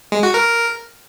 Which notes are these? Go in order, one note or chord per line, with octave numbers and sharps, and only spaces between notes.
G#3
F#4
A#4